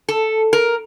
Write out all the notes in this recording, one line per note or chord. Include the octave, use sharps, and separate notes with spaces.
A4
A#4